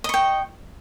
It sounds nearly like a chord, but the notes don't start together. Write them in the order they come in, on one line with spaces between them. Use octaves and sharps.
D#5 C#6 G5